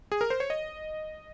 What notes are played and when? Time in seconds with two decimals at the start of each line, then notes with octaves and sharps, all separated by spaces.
0.12 G#4
0.21 A#4
0.30 C5
0.40 C#5
0.50 D#5